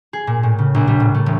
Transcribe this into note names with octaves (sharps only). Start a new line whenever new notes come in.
G#4
A#2
A2
C#3
A#1
G3
A2
A3
E1